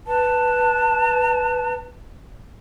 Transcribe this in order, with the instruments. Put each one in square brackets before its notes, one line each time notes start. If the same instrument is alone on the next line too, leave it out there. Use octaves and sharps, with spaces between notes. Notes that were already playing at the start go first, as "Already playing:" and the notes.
[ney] B4 [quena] A5